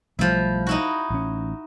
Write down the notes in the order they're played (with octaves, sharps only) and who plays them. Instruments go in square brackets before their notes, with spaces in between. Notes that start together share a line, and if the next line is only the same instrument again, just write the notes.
[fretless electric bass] B1 G3 A3 [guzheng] F3 E4
[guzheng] D#4 E4 F#4
[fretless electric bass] A1 C#4